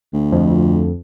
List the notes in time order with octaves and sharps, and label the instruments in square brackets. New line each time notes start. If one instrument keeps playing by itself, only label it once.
[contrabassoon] D2
[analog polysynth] F2